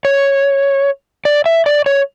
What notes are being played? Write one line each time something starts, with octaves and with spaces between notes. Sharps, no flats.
C#5
D5
E5
D5
C#5